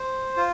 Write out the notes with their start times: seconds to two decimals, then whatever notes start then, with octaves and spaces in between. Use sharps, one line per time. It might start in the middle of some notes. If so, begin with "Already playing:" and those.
Already playing: C5
0.37 F4